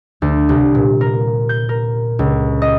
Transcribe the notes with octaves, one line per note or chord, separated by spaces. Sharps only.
D2
C2
A#2
A#4
G6
A#4
C#2
D#5